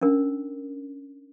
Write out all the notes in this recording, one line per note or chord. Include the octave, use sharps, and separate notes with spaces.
C#4 D4 A#4